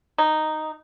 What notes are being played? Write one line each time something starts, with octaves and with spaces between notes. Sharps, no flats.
D#4